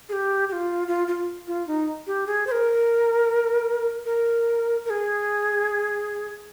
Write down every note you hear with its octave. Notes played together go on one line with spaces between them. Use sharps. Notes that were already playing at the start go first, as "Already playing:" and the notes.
G#4
G4
G4
F4
F4
F4
F4
D#4
G4
G#4
C5
A#4
A#4
A#4
G#4